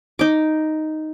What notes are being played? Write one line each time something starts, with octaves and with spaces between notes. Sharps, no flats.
D#4 D6